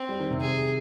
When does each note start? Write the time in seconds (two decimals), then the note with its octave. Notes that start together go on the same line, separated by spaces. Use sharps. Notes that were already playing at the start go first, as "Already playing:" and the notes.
Already playing: C4
0.09 G3
0.20 D#3
0.30 C3
0.40 G#4